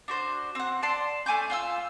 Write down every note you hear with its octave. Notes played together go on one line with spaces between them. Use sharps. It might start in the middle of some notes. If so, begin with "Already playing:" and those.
D4 F#4 C5
C4 F#5
D5 A5 C6
A3 G#5 D6 G6
F4 F5 E6